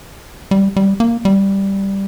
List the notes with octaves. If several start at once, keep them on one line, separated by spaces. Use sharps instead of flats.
G3
G3
A#3
G3